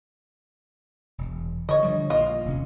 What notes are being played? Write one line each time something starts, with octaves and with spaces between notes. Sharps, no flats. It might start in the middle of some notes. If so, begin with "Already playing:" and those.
E1
D3 C#5 D#5
D3 F3 G3
A#1 A#3 F4 D#5
D1 C3 C#4